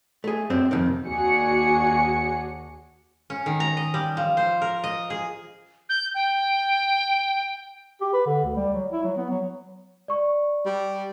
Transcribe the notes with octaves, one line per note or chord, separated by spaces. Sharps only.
A3 G#4
F#2 C4 D4
F2 C3 D#3
D#2 D4 F#4 G#4 C#7
C#4
D#3
A#5
D#5
G3
F3
C5
A#4
D#5
G#4
G6
G5
G4
B4
D3
D2
G3
F#3
E4
F#3
B3
F#3
D5 C#6
G3